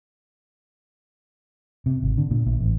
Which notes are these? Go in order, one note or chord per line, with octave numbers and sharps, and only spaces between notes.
C3
G#1
D3
A#2
A#1
A1